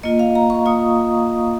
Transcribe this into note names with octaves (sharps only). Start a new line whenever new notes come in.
A#3 F4 D#5
F5
A#5
C#6
A#3 F4 D#6